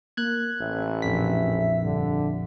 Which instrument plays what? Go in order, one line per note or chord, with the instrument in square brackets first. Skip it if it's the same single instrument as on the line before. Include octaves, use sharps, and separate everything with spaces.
[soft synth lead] A#3 [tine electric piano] F#6 G#6
[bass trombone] A1 [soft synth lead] E5
[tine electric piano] A#1 F2 B6
[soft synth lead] G2 [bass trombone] D3